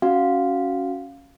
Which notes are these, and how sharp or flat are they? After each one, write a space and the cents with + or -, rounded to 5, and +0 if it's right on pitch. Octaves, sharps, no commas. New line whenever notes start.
C#4 +0 F#4 +0 F5 +0